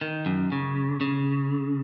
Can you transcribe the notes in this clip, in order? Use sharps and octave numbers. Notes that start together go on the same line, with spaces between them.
D#3
F#2
C#3
C#3